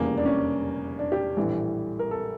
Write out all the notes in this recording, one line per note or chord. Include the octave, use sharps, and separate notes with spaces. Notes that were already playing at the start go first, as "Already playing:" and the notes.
Already playing: F1 E2 C#3 G3 A#3
D4
C#4
D4
G4
A#1 A2 E3 G3
A#4
A4